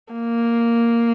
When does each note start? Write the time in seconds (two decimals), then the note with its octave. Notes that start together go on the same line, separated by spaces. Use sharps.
0.13 A#3